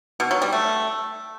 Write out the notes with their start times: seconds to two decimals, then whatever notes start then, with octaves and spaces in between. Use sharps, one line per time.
0.20 B2
0.31 F#3
0.42 G3
0.53 A3